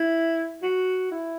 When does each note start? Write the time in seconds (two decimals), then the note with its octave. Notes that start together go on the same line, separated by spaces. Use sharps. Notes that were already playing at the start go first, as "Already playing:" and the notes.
Already playing: E4
0.62 F#4
1.11 E4